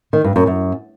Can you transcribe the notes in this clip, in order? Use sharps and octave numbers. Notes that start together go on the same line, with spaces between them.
D#3
G2
F#2
F#2